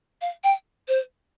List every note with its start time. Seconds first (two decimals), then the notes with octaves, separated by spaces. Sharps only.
0.21 F5
0.44 G5
0.88 C5